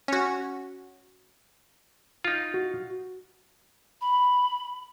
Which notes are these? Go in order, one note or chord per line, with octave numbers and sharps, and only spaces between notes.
C#4 F#4
D#4 F4
F#4
B5